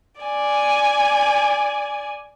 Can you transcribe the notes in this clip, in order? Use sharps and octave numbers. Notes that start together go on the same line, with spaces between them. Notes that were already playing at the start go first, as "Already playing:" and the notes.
D5 G#5